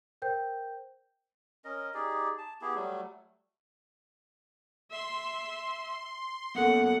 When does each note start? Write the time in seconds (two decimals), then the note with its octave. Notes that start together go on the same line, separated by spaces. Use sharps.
0.22 A#4 C5 G5 G6
1.65 C#4 A#4 D#5
1.94 D#4 G4 G#4 D5
2.38 A5
2.61 B3 E4 G4 G#4
2.75 F#3 G3 A3
4.91 E5 C6
6.55 F#2 A#3 B3 A4 F#5